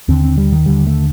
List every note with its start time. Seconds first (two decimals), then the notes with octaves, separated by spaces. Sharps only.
0.08 D#2 D3 C4
0.24 C4
0.38 G3
0.52 D#3
0.66 D#2 D3 G3
0.87 A3